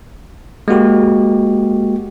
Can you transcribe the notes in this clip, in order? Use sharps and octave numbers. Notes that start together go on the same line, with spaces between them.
G#3 A#3 F#4 G4